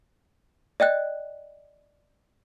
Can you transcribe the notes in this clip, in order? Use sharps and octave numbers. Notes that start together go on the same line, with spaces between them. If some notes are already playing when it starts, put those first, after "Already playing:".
D5 D#5 G5 F#6